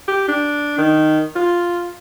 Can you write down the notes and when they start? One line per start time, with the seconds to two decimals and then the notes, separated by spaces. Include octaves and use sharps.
0.08 G4
0.28 D4
0.78 D#3
1.36 F4